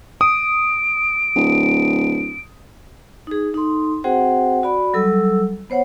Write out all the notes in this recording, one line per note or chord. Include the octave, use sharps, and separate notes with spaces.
D#6 D7
D1
D#4 G#4
D#4 A4 C6
C4 F#4 G#4 C5 F#5 G5
F#4 D5 B5
F#3 G3 A4 E6
B3 C5 C#5 F#5